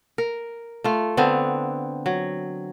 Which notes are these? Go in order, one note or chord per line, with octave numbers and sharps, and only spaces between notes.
A#4
A3 F4
D3 B3 C4
F#3